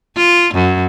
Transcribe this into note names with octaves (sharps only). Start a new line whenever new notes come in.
F4
F#2